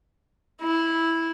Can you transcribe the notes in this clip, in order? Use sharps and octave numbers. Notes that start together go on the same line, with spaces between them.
E4